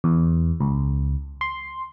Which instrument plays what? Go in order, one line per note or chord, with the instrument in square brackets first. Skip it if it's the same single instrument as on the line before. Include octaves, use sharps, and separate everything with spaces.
[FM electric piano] E2
C#2
C6